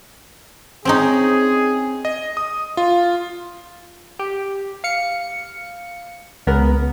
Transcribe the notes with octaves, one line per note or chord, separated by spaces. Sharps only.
C4 C#4 D#4 G#4
D#5
D#6
F4
G4
F5 C#7
C#2 B3 A#4